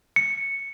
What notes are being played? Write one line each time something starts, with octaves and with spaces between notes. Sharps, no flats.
C#7